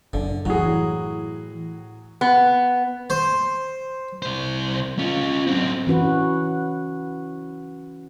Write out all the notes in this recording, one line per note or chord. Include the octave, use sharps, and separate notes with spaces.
F#1 D3
A2 E3 F#3 F#4 G#4
B3
C5
C2 C5
C#4 F4
F#3 C4
E3 C#4 F#4 B4